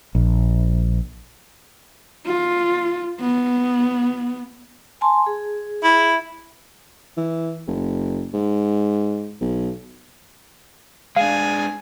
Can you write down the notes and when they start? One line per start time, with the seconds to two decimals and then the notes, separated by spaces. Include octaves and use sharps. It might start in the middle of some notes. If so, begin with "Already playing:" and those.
0.15 A#1
2.27 F4
3.20 B3
5.01 G#5 A5 C6
5.26 G#4
5.83 E4
7.17 E3
7.67 F#1
8.33 G#2
9.41 B1
11.16 G#3 D4 F5 G#5